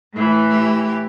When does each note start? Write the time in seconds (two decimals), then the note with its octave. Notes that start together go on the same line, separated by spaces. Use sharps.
0.13 A2 E3
0.51 G4